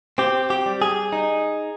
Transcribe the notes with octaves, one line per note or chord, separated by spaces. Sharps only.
C4 G4
G4
G3
G#4
D#4